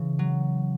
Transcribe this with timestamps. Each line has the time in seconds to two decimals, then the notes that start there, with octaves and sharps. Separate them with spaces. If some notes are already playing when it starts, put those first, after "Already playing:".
Already playing: C#3 E3
0.19 F#3